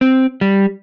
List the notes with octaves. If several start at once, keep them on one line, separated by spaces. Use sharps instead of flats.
C4
G3